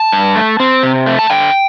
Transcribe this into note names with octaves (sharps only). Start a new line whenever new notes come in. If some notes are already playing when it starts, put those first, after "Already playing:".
Already playing: A5
G2
A3
C4
C3
A3
A5
D3 G5